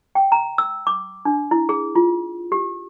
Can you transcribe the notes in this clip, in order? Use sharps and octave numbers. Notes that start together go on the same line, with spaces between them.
G5
A#5
E6
D6
D4
E4
G#4
F4
G4